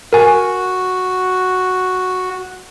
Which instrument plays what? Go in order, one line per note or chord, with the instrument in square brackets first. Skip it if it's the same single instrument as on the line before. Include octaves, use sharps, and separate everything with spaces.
[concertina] F#4 [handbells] A#4 G#5